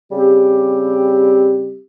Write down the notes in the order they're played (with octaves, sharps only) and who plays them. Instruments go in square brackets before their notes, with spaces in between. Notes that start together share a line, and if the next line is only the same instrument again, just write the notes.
[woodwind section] C#3 G3 C4 G4